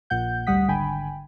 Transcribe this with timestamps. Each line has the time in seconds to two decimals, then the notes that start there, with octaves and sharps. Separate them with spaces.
0.10 A#1 A#2 F#5 G6
0.47 G#1 D2 G3 F#5 D#6 B6
0.68 G#1 D3 G5 G#5 B5